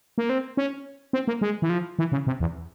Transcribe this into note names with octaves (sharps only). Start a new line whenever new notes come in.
A#3
C4
C#4
C4
A#3
G#3
E3
F3
E3
C#3
C3
E2